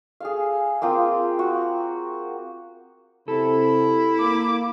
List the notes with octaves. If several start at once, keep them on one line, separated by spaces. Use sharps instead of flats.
G#4 A4 F5
A#3 C4 F4 D#6
F#4
C3 E4 A4
A#3 D6